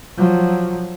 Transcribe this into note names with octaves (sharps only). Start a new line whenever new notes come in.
F3 F#3